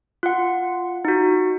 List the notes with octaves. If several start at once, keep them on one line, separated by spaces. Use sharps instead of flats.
F4 F#5
D#4 F#4